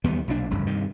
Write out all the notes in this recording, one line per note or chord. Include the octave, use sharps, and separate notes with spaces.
D#2 G3 B3
B1 A#2 F#3 D4
F1 D2 G2 C#3
G2 C3 D#3